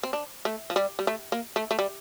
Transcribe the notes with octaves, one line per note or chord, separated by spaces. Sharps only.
C4
D4
A3
F3
G3
G3
A3
A#3
A3
A3
G3